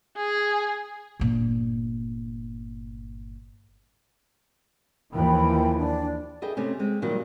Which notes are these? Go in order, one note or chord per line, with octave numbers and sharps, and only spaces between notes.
G#4
G1 A#2
D#2 E3 F3 G5 B5
D4
G#4 A4 B4 D#5 E5 G5
C3 A3 C#4
G#3 C4
A#2 D#3 F#3 G3